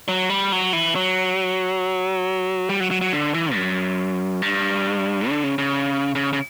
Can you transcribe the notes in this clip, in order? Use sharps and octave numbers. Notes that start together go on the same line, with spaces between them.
F#3
G3
F#3
E3
F#3
G3
F#3
F#3
F#3
D3
E3
F#2
G2
D3
C#3
C#3
C#3
C#3